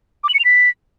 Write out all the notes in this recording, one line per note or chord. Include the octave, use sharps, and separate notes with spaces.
D6
F#7
C#7
F7
B6